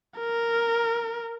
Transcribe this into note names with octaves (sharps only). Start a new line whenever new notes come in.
A#4